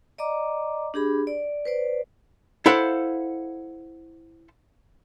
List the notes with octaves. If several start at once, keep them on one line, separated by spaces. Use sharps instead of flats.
D5 D#5 A#5 D6
D4 G4 G#4 B5
D5
B4 C5 D5
E4 A4 C5 F5 F#5